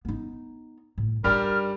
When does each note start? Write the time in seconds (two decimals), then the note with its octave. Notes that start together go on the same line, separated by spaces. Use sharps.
0.05 B3 D#4
0.98 A2
1.24 G2 G3 D4 D#4 G4 A#4 F6